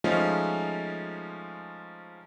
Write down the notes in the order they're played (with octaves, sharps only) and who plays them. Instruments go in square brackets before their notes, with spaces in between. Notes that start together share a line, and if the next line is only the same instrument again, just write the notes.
[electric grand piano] F3 G#3 A3 C#4 D#4 F4